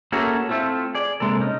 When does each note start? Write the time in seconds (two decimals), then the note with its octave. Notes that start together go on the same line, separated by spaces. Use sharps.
0.12 A3 A#3 C#4 F#4 G#4 A4
0.49 A3 C4 E4 F4
0.95 G#4 D5
1.20 C3 G#3 A#3 A4
1.41 C#4 D#4